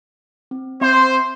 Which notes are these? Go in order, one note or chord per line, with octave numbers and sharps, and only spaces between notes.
C4
C4 C5 E5 C6